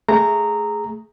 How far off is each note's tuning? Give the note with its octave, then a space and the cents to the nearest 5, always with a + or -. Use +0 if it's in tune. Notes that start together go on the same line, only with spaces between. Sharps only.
A3 +0 G#4 +0 A#5 -10